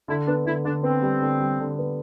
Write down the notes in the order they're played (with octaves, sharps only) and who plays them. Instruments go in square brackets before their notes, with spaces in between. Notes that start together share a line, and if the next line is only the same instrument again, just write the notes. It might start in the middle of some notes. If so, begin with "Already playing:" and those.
[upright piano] D3 [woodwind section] E4
[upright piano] B3 [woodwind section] D4
[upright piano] D3 [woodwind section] E4
[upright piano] D3 [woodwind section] D4
[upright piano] B3 [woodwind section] C4
[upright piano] G3
D3
G3
D3
B3